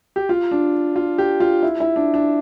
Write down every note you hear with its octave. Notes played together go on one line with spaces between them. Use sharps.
G4
F4
D4
F4
G4
F4
E4
E4
D4
D4